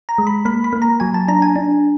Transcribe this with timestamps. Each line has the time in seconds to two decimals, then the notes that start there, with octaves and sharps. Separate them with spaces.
0.09 A#5
0.18 G#3
0.27 B5
0.45 A#3 B5
0.64 B5
0.73 A#3
0.82 A#5
1.00 F#3 G#5
1.14 A5
1.28 D4 A#5
1.42 G#5
1.56 D4